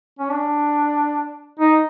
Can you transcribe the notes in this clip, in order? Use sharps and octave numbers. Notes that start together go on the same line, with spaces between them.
C#4
D4
D#4